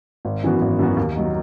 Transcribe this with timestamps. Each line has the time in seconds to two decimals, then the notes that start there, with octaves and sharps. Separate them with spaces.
0.25 G#1
0.43 F#2 E3 B3 F#4
0.61 G#1
0.79 F#2 E3 B3 F#4
0.97 D#2
1.16 D#3 F#3